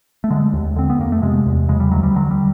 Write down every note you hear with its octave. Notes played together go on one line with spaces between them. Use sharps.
A3
D3 G#3
D#2
D3 C4
B3
F2 A#3
A3
C3 G#3
E2
C#3 G#3
G3
D2 F#3
G3
D3 F#3
G3